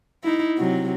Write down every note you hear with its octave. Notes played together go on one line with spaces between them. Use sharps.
D#4 E4
C3 F#3